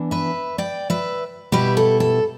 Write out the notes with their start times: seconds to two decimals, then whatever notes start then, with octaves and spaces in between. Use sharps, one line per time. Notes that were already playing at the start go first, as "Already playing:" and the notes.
Already playing: E3 B3 D4
0.11 B4 E5
0.58 D5 G5
0.90 B4 E5
1.52 B2 G3 E4 G4 B4
1.77 A4
2.00 A4